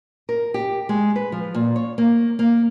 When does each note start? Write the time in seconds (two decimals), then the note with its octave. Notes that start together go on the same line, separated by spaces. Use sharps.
0.29 A#4
0.54 G4
0.89 G#3
1.16 B4
1.32 F3
1.54 A#2
1.76 C#5
1.98 A#3
2.39 A#3